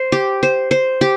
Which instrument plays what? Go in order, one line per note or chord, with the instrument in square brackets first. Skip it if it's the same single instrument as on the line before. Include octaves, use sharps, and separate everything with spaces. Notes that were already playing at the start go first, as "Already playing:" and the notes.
Already playing: [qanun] C5
G4
C5
C5
G4